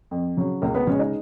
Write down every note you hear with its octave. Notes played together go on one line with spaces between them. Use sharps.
F2
C#3 F#3
C#2 A#3 A#4
B3 B4
C#3 G#3 C#4 C#5
D#4 D#5